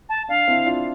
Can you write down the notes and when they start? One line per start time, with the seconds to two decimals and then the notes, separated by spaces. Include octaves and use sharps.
0.09 A5
0.28 D4 F5
0.48 C4 E4
0.66 D4 F4